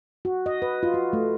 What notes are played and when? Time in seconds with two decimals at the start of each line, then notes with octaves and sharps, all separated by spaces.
0.25 F#4
0.46 D#5
0.62 B4
0.83 F4
0.94 F#4
1.13 A3